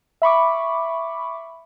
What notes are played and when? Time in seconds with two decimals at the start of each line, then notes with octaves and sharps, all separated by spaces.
0.22 E5 B5 C#6 D6